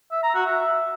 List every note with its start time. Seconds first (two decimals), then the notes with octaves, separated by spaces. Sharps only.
0.11 E5
0.23 A#5
0.35 F#4
0.46 E5